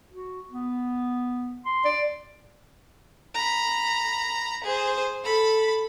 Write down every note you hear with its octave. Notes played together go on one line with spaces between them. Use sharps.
F#4
B3
C6
D5
A#5 B5
G#4 C5
A4 B5